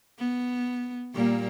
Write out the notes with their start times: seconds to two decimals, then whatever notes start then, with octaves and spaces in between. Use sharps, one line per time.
0.19 B3
1.14 A#2 G3 A#3